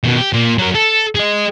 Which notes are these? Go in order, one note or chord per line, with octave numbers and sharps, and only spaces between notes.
B2 D#3
G4
A#2
F#3 A#4
A4
G#4 D#5